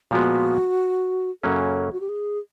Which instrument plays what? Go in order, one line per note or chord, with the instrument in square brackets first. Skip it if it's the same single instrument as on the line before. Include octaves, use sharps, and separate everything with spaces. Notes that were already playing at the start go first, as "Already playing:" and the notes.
[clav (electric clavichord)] A#2 F3 G#3 B3 [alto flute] F#4
[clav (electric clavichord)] F#2 C#3 F#3 A#3 C#4 [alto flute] A4
[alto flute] F#4
G4
G#4